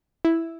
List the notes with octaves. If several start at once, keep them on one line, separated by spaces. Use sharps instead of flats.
E4